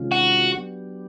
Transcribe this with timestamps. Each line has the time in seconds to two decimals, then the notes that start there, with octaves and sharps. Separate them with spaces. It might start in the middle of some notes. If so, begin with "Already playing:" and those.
Already playing: C3 D#3 G#3 C#4 F4
0.12 F#4
0.54 F#3 B3 D4 G4